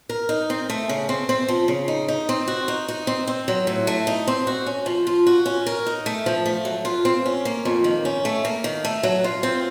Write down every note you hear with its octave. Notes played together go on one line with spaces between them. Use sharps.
A#4
D#4
C4
A3
C#3
C4
C4
F3
C#3
D#4
D#4
C4
F#4
D#4
D#4
C4
C4
F#3
A2
A3
D#4
C4
F#4
C#4
F3
F4
F#4
C#4
A#4
D#4
A3
F3
A3
F#3
F4
C4
C#4
A#3
F2
D#3
C#4
A3
A#3
D#3
A3
F#3
F4
C4